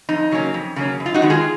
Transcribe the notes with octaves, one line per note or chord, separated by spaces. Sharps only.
F2 D#4
C#3 F#3 A#3 C#4
F2
C#3 F#3 A#3 C#4
F#2
F4
D#4 F#4
D#3 G#3 B3
F4 G#4